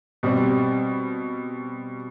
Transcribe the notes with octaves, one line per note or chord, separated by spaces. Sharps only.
B2 G3 C4